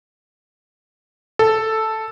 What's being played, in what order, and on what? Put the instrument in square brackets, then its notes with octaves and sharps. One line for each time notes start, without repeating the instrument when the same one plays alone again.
[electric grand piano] A4